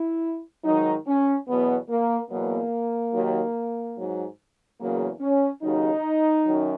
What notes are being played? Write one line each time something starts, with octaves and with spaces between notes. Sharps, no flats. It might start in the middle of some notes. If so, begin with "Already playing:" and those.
Already playing: E4
G#2 D#3 F#3 D#4
C#4
E2 B2 F#3 B3
A#3
E2 B2 F#3 A#3
D#2 D#3 F#3
G#2 F#3
E2 C#3 F#3 A#3
C#4
D#2 C#3 F#3 D#4
F#2 D#3 F#3